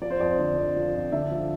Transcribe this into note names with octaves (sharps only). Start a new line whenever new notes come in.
F3 D5
C5
F2 D5
D3
F2
F3
F2
D3 E5
F3